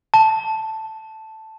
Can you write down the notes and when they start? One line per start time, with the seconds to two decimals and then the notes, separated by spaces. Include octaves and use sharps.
0.14 A5